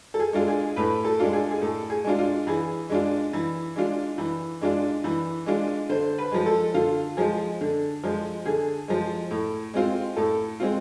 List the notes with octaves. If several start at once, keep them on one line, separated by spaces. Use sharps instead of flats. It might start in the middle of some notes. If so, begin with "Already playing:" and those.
A4
G#4
G#3 D4 F4
G#4
A2 B4
A4
G#3 D4 F4
G#4
G#4
A2 A4
G#4
G#3 D4 F4
F4
E3 G#4
G#3 D4 F4
E3
G#3 D4 F4
E3
G#3 D4 F4
E3
G#3 D4 F4
D3 C5
B4
F3 G#3
A4
D3 F4
F3 G#3 G#4
D3
F3 G#3
D3 G#4
F3 G#3
A2
G#3 C4 F4
A2 A4
G#3 C4 F4